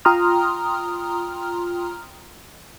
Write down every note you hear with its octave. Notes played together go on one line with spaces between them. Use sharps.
F4 G5 A#5 C6 D#6 F6